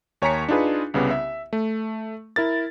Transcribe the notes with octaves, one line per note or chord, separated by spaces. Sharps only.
D#2 C#5 G#5 A#5 B6 C#7
D4 D#4 F4 G#4 B4
C2 C#3 B3 G4
E5
A3
E4 A#4 A6